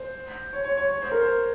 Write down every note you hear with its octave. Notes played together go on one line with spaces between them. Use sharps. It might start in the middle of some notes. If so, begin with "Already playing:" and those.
Already playing: C5
C#5
C#5
C#5
C#5
C5
A#4
C5